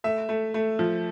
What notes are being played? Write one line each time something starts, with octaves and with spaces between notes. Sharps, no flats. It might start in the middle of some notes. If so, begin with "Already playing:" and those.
A3 E5
A3
A3
F3